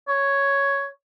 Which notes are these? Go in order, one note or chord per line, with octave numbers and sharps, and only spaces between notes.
C#5